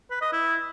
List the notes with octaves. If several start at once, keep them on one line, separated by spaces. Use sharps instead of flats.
B4
D#5
E4